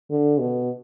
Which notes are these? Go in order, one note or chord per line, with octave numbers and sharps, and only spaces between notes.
D3
B2